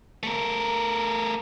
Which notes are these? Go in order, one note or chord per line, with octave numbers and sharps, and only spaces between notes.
A3 A#4